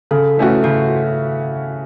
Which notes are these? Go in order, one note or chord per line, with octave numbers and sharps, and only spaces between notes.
C#3 A4
E3 A3 C#4 F#4
C#3 F#4